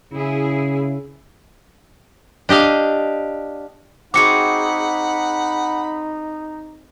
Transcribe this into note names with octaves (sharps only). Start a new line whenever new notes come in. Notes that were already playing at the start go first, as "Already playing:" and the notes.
C#3 E4 G#4
D4 G4 D#5 F5
C4 D#4 F#4 G#4 F#5 B5 D6 C#7